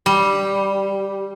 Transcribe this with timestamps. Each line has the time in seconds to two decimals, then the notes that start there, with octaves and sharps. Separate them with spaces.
0.06 G3